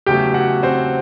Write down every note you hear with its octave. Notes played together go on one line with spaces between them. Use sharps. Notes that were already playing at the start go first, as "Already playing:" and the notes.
E2 C#3 F#3 A3 G4 G5
F#4 F#5
C4 C5